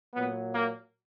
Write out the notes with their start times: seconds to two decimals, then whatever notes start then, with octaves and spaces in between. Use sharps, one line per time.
0.13 A#2 F#3 B3
0.53 A#3